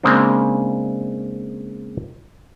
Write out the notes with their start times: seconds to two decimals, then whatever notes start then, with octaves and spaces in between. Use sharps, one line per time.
0.03 C#3 G#3 A#3 C4 D4